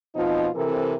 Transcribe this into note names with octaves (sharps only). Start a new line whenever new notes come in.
B2 F3 C4 D#4 F4
C3 E3 C4 A4 A#4